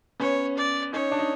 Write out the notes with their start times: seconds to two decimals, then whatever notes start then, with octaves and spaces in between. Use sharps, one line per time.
0.20 B3 C#4 C#5
0.57 D5
0.93 C#4 D#4 C#5
1.11 D4
1.19 D#4